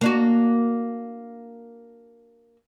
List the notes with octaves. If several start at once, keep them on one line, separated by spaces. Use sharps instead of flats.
A#3 D4 F#4